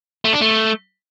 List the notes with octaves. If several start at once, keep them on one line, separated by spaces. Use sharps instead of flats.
A3
D4
A3